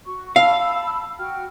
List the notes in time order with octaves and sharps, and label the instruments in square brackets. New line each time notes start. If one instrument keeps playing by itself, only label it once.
[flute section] F#4 C#6
[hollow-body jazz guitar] F5 [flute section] A5 B5 E6
[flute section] F#4 G5 F6